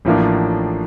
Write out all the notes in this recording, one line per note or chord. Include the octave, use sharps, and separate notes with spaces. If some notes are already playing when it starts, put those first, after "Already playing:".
A1 A2 F3 A#3 D4